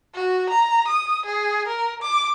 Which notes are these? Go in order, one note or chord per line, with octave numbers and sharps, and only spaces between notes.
F#4
A#5
D#6
G#4
A#4
D6